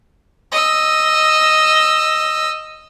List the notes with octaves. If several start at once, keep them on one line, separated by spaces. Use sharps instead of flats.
D#5 E6